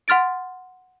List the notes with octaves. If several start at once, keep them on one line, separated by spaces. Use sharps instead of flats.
F#5 C6 F6 A6 D7